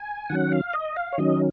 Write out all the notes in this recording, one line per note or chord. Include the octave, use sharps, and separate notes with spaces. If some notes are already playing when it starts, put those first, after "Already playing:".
Already playing: G#5
D#3 F#3 C#4 F#5
F5
D#5
F5
C#5
D#3 F#3 C#4 D#5